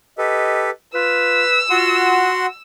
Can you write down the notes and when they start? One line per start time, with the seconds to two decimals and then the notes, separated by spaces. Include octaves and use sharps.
0.18 G4 A4 B4 D#5
0.94 F4 B4 E6
1.70 F4 F#4 F#5 C6